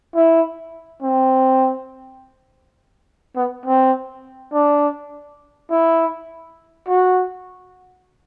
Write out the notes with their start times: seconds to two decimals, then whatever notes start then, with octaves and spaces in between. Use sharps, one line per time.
0.15 E4
1.03 C4
3.36 B3
3.66 C4
4.53 D4
5.71 E4
6.88 F#4